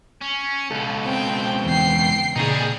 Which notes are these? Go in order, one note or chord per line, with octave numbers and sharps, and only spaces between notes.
C#4
C#2 B2 A4
C4 G5
E2 G5 C7
A#2 C#3 G3 D#4 G#4